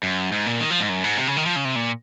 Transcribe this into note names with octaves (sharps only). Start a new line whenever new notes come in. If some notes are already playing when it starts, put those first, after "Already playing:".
F#2
G#2
A#2
D#3
F3
G#2
F#2
G#2
C3
C#3
D#3
F3
C#3
C3
A#2